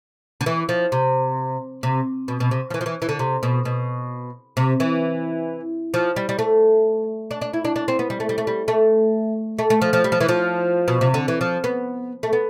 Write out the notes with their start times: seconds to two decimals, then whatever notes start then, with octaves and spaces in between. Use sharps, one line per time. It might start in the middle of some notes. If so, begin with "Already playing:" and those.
0.41 D3
0.46 E3
0.69 F3
0.92 C3
1.83 C3
2.28 B2
2.40 B2
2.51 C3
2.70 F3
2.74 E3
2.81 F3
2.86 E3
3.02 E3
3.09 D3
3.19 C3
3.43 B2
3.65 B2
4.57 C3
4.80 E3
5.94 F3
6.16 G3
6.29 G3
6.39 A3
7.31 D4
7.41 D4
7.54 E4
7.65 D4
7.76 D4
7.88 C4
7.99 B3
8.10 G3
8.20 A3
8.29 G3
8.38 A3
8.47 G3
8.68 A3
9.59 A3
9.70 A3
9.82 F3
9.93 F3
10.04 G3
10.12 F3
10.20 E3
10.29 F3
10.88 B2
11.01 C3
11.14 D3
11.28 E3
11.41 F3
11.64 B3
12.23 A3
12.33 B3